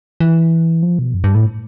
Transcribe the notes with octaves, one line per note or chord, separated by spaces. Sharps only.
E3
F3
B2
F#2
G2
A2